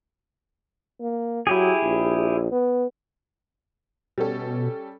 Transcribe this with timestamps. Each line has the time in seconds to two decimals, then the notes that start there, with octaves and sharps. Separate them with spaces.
1.01 A#3
1.47 F#3 E4 G4 G#4
1.83 A#1
2.51 B3
4.18 B2 G3 C#4 A4